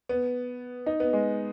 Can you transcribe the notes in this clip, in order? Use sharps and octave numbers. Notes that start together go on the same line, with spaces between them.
B3
D#4
B3
G#3